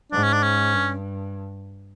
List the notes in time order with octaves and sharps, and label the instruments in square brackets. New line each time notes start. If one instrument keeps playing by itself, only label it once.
[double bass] G#2 [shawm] D4
[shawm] C#4
D4
C#4
[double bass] G2